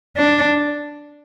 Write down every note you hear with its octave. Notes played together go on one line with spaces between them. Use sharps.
D4